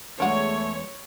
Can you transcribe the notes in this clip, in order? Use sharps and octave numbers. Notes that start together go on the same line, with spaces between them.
E2 G#3 A3 D4 F#4 C#5